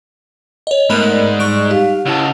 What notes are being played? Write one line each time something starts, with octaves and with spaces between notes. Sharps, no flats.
C#5 D#5
G#2 A3 B3 A#4 B5 F#6
D5
G3 D#4 C#6 F#6 D7
G4 F5
C#2 E4 F#5 A5